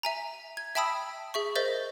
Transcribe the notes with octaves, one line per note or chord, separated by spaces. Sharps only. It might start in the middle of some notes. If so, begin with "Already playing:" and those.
E5 G#5 A#5
G#6
E5 G5 A5 B5 D#6 E6
G#4 E5 C#6
A#4 C5 D#5 E5 G6 A6